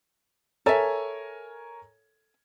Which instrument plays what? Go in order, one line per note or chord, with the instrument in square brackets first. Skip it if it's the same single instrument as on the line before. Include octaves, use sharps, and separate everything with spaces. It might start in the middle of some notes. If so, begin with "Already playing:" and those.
[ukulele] A4 E5 [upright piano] A#4 C#5 G#5